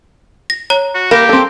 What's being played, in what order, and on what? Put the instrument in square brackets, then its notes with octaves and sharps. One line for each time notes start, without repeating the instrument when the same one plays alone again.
[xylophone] A#6
C#5 A#5
[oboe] F#4
[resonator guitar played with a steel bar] A#3 [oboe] G4 [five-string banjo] A#4 [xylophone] B5
[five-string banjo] C4 A4